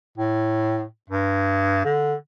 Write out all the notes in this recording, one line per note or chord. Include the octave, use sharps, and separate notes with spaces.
A2
G2
D3